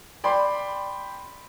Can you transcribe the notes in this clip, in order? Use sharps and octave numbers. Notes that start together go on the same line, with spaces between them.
D5 G5 B5 C6